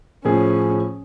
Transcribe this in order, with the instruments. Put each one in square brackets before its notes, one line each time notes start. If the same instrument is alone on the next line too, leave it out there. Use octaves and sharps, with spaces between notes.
[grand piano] A2 F3 G#4 [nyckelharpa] C#4